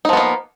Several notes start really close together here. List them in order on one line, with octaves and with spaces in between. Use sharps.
D#4 F3 B3 A#3